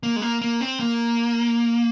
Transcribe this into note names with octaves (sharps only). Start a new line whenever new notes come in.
A#3
G#3
A#3
A#3
C4
A#3